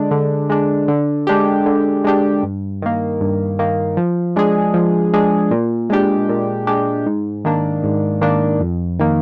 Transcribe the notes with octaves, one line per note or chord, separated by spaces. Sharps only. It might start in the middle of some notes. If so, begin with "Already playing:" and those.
Already playing: D3 G#3 D4
D3
G#3 D4
D3
G#3 D4 G4
D3
G#3 D4 G4
G2
D#3 A#3
G2
D#3 A#3
F3
G#3 D4 G#4
F3
G#3 D4 G#4
A#2
G#3 D4 G4
A#2
G#3 D4 G4
G#2
D#3 A#3 D4
G#2
D#3 A#3 D4
F2
D#3 A#3